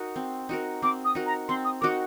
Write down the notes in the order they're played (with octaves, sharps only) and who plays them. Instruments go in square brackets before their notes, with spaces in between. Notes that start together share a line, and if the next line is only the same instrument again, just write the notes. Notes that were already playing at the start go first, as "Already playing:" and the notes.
Already playing: [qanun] D#4 F#4 A#4
C4
D#4 F#4 A#4
[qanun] C4 [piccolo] D6
[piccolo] D#6
[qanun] D#4 F#4 A#4
[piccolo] A#5
[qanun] C4 [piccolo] C6
[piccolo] D#6
[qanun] D#4 F#4 A#4 [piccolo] D6